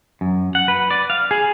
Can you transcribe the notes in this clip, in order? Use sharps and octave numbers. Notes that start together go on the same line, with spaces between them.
F#2
F#5
B4
D5
F5
G#4